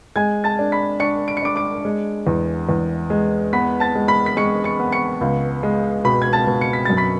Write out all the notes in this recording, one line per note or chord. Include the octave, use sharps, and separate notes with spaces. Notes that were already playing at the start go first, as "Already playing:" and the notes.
G#3 G#5 G#6
A5 A6
D4
B5 B6
D4 C#6 C#7
D7
C#7
D4 D6 D7
D6 D7
G#3
E2
E2
G#3
B3 B5 B6
A5 A6
G#3
B5 B6
B6
G#3 C#6 C#7
C#6 C#7
B3
C#6 C#7
C#2
G#3
B2 B5 B6
G#6
A5 A6
B2
C#7
B6
F#2 A6
B5 B6